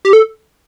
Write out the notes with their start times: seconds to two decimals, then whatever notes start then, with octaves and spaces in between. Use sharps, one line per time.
0.05 G4
0.13 A4